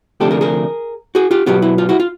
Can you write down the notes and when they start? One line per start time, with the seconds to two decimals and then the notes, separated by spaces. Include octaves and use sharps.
0.20 D2 C3 F3 A3 D4 G4 A4
0.31 G#4 A#4
0.41 G#4 A#4
1.15 F#4 G#4
1.31 F4 G4
1.46 B2 F#3 B3 F4 G4
1.62 E4
1.78 F4
1.89 E4 F#4
2.00 F4